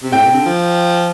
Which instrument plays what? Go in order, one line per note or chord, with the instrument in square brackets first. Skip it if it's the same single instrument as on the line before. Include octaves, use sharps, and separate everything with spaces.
[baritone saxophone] C3
[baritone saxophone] A2 [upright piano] G5
[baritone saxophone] C3
D3
F3